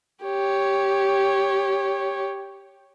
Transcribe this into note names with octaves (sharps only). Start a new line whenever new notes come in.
G4 C#5